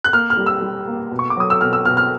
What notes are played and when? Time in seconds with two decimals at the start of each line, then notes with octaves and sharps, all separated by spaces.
0.04 F#6
0.13 A#3 F6
0.30 F6
0.37 G3
0.46 E6
0.62 G3
0.88 A#3
1.11 B2
1.19 C#6
1.30 D6
1.37 F#3 D#6
1.50 E6
1.61 B2 F6
1.73 E6
1.85 B2 F6
1.97 F6